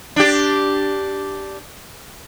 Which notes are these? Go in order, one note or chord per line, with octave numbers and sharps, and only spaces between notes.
D4 G4